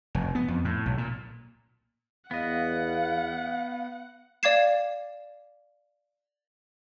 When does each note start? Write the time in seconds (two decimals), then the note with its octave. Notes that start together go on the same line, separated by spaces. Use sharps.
0.15 F1
0.35 B3
0.48 F2
0.64 A2
0.86 B1
0.98 A#2
2.31 E2 B3 D#5 F5 F#5
4.43 D5 F5 D6 G#6 C7 E7